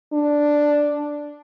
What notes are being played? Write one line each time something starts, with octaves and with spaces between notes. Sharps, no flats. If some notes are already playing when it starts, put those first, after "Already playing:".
D4